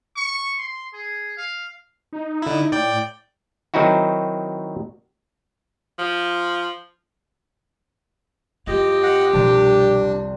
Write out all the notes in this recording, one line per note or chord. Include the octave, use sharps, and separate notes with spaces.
C#6
C6
G#4
F5
D#4
D3 E4
A2 D5 G5
D#3 F#3 C4 D#4 E4 F#4
F3
F2 E4 G4 D#5
C5 D#5 F#5
C2 B2 F3 D4